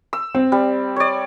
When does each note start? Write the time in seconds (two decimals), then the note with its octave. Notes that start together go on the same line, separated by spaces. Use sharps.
0.13 E6
0.35 C4
0.52 G3
0.96 C#5 D5